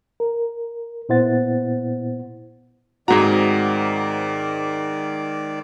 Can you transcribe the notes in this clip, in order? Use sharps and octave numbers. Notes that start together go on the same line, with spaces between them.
A#4
A#2 B3 E4 C5 F#5 A6
G#2 D#3 G#3 C4 F#4 D5 A#5